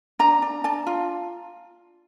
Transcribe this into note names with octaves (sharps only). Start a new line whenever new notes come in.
D4 A#5
D4
D4 A5
F4